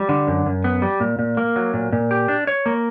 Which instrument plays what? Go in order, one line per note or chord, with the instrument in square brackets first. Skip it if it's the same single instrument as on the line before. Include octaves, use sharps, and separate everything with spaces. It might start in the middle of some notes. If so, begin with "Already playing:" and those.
Already playing: [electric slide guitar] G3
D3
F#2
F#2
B3
G3
A#2
A#2
A#3
F#3
A#2
A#2
G4
D4
C#5
A#3